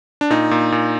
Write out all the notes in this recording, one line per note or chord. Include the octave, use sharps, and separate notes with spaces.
D4
A#2 D#4
A#2
A#2